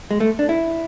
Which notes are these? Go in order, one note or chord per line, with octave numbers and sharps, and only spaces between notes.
G#3
A3
D4
E4